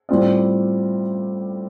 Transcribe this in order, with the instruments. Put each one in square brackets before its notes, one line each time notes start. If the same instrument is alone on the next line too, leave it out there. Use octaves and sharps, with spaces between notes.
[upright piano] A2 G3 C4 F4 D5